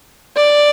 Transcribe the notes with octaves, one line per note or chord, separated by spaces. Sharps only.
D5